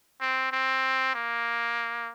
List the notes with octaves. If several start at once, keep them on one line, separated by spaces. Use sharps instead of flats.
C4
C4
A#3